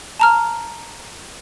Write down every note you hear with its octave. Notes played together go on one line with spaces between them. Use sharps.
A5 A#5 F6